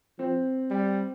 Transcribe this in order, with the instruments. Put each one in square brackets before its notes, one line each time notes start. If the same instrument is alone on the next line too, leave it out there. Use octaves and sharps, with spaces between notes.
[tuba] F3 [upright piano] C4
[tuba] G3